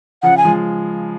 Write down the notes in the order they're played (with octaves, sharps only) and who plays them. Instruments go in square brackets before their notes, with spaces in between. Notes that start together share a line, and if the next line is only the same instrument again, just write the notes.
[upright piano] C#3 F3 [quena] F#5
[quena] G#5
[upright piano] F3 G#3